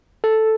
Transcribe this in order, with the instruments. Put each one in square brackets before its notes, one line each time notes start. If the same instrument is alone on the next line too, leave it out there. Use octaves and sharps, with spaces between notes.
[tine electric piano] A4